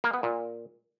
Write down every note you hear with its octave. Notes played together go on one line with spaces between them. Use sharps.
A#3
B3
A#2